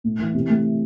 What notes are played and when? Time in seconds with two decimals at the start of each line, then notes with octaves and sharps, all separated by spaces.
0.04 A2
0.19 E3
0.34 C3
0.49 A3